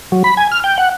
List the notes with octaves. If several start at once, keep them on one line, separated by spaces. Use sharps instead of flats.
F#3
B5
G#5
F6
G5
F#5